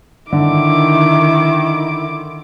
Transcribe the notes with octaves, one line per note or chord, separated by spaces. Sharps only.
D3 D#3 E4 D6